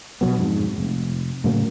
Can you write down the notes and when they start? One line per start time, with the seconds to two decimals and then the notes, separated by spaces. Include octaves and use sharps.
0.21 B2 D3 F#3 B3
0.37 F2 G#2
0.78 F1
1.44 A2 C#3 F#3 A#3